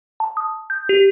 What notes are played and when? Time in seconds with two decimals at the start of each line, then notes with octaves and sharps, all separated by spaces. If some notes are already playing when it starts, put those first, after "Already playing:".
0.20 A5
0.37 D#6
0.70 G6
0.89 G4